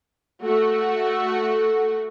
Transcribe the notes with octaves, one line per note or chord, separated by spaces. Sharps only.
A3 F#4